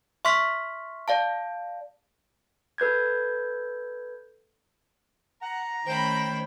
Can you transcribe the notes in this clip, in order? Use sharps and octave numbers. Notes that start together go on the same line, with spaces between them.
E5 C6 C#6 F6 B6
D5 F5 A5
A4 B4 G6 G#6
F#5 A#5
D#3 A3 C#4 C5 G5 B5